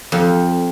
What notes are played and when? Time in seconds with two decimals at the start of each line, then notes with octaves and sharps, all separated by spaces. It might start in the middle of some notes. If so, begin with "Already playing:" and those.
0.12 F2